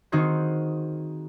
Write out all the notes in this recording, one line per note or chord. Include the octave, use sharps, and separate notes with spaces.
D#3 C4 D#4 F#4 G#4 C5